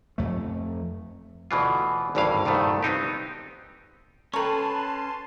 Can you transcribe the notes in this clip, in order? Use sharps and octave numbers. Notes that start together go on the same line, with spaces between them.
F2 A3
D2 B2 E3 F4
G#1 D2 G2 E3 F5
C2 G2 A#2 D#3 A3
B3 C4 D#4 G4
C#4 A4 B4 G5 A5 A#5 C6 C#6